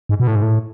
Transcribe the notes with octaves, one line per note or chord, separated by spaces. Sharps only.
G#2
B2
A2
G#2
A2